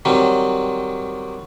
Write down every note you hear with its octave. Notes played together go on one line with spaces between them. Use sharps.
D#3 F#3 G3 C4